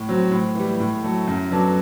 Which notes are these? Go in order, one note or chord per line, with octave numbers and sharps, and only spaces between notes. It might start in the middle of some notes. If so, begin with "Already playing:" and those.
Already playing: A2
F#3 C4
A2
E3 G3
A2
F#3 A3
F#2
F#3 B3 D4 A4